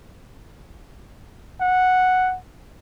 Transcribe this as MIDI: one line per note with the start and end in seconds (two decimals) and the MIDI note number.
1.60 2.36 78